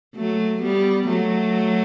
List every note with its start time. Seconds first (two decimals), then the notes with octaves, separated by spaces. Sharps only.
0.16 F#3 A3
0.62 G3 B3
1.07 F#3 A3